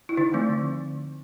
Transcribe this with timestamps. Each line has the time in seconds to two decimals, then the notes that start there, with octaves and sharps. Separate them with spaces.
0.09 E4
0.17 D3 D#4
0.34 F3 A3 C4
0.50 D3